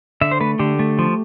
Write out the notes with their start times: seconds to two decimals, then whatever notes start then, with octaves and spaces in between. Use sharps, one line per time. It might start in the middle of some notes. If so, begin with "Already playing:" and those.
0.21 D3 E5
0.31 C5
0.40 A3 B4
0.59 D3 G4
0.79 A3
0.99 F3